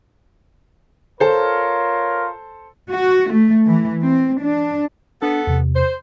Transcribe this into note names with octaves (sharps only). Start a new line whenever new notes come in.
F4 A4 A#4 C5 C#5
F#4
A3
E3
C4
D4
B3 D4 A4
E2 C3
C5